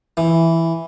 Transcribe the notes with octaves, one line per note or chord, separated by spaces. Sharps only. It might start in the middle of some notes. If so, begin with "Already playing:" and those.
E3